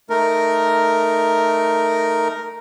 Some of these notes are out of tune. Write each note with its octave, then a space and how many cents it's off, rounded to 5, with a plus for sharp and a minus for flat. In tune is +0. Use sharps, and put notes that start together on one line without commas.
A3 +0 D#4 +0 A#4 +0